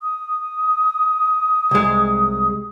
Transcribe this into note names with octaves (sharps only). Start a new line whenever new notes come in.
D#6
C2 G#3